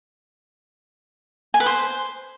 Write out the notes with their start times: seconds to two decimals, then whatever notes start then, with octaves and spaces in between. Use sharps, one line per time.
1.54 G#5
1.60 B4
1.66 C5